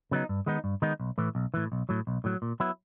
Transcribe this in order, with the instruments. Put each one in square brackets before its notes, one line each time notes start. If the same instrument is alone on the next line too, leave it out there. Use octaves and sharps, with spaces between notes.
[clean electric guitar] C#3 F#3 B3 D#4
G2
D#3 G#3 B3 D#4
G2
D#3 G#3 B3 D#4
B1
A2 E3
B1
A2 E3
B1
A2 F#3
B1
A2 F#3
A#2
F#3 B3 E4